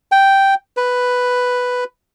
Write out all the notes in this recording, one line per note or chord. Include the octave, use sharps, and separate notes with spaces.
G5
B4